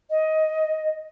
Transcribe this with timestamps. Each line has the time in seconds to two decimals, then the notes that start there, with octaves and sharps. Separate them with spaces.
0.10 D#5